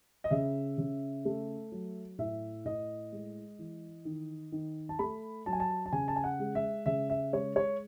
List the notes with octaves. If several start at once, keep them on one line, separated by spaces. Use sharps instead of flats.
D#5
C#3 E5
C#3
A3
F#3
A2 E5
A2 D#5
G#3
E3
D#3
D#3
A5
A3 B5
F#3 A5
G#5
A5
A5
C#3 G#5
A5
G#5
F#5
G#3
E5
C#3 E5
E5
G#3 C#5
C#5